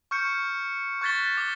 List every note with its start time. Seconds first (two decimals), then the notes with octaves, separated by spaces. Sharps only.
0.11 C#6 F6 G6 C#7
1.01 C#6 F#6 G#6 A6 B6 G7
1.37 D6 G7